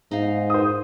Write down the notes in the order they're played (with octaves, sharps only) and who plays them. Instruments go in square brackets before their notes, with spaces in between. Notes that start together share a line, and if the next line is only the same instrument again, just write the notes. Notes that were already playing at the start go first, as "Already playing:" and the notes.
[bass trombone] G#2 [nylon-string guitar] D#4 F5
[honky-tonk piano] C5 D#6